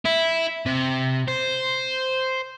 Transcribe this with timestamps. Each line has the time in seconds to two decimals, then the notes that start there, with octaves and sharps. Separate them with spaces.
0.05 E4
0.66 C3
1.28 C5